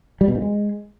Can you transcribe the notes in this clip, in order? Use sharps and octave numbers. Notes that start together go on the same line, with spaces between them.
G3
B2
G2
G#3